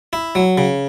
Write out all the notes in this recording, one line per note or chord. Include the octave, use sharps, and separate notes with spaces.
E4
F#3
C#3